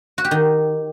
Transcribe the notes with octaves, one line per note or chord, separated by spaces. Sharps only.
F#4
G4
D#3